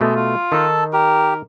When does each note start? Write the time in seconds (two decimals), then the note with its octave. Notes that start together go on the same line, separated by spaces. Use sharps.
0.01 B2 G#3 A3
0.15 F4
0.52 D#3 D#4 A4 A5
0.93 G4 A#4